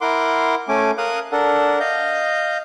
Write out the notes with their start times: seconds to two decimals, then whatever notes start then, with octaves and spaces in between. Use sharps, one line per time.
0.01 E4 A#4 F#5 C6 D6
0.69 A3 C#4 G#5 D6
0.98 A#4 F5 D#6 F#6
1.32 D4 A4 A#4 F#5
1.80 D#5 F5 G6